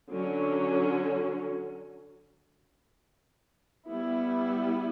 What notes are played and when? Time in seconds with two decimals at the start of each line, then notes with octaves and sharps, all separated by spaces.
0.11 D3 F#3 C#4
3.87 G3 B3 E4